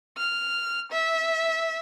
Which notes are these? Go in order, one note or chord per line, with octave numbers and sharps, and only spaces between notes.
F6
E5